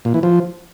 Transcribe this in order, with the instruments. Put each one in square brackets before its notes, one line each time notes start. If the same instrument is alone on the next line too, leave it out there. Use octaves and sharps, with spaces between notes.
[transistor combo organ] A#2
E3
F3